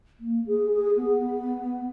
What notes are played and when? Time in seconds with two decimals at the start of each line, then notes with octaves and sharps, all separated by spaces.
0.20 A#3
0.46 G#4
0.72 G#4
0.96 B3